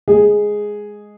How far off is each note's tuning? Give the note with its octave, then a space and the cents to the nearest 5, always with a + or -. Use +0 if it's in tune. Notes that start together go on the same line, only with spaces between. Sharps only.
G#3 +0 G#4 +0